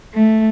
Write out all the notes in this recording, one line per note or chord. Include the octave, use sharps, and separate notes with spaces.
A3